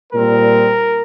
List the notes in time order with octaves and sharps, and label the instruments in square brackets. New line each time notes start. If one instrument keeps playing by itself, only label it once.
[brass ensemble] A#2 G3 C4 A#4